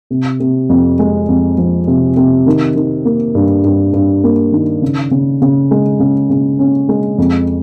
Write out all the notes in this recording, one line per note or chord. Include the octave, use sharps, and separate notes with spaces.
C3
C3
F2
G#3
F2
F3
C3
C3
D#3
D#3
A#3
G2
G2
G2
A#3
D#3
C#3
C#3
C#3
G#3
C#3
C#3
C#4
G#3
F2